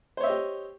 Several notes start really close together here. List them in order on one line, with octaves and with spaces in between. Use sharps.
C5 C#5 E5 D#5 G4